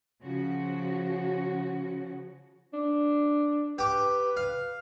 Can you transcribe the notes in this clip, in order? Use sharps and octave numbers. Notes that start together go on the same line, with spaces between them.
C#3 F3 F#4
D4
G4 B4 D6
F5